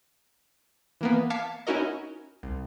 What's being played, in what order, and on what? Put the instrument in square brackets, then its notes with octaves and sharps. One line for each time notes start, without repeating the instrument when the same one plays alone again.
[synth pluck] E3 A#3 B3
F5 A5 D6 G#6 B6 C#7
C#4 D#4 E4 F#4 A#4 D#5
C2